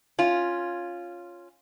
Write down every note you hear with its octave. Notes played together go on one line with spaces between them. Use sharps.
C#4 F4